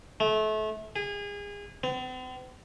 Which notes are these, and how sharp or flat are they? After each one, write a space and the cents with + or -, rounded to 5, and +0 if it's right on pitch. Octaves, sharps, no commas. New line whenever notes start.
A3 -30
G#4 -30
C4 -45